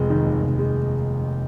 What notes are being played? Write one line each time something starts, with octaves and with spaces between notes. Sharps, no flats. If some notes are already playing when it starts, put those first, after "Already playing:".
Already playing: F1 G#3
D#3
D#2
F1
G#3